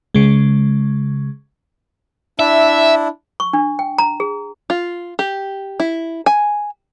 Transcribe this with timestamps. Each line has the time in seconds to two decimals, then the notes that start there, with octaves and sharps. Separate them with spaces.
0.15 C#3 G#3
2.39 D4 E4 E5
3.40 C#6
3.53 D4
3.79 G5
3.98 A#5
4.20 G#4
4.70 F4
5.19 G4
5.80 E4
6.26 G#5